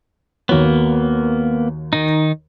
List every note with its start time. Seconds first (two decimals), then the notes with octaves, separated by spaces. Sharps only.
0.49 D#2 A#3 B3 F#4 C#5
1.93 D#3 D#4